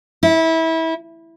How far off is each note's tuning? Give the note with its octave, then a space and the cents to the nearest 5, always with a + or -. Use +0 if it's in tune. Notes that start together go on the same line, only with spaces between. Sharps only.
E4 -25